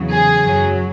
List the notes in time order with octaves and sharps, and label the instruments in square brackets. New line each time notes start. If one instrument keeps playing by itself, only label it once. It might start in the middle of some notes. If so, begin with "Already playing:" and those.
Already playing: [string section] E2 C#3 F#3
G#4
F#2 F#3